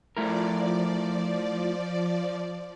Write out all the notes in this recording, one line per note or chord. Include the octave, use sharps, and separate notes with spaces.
F3 A3 E4 A#4 D5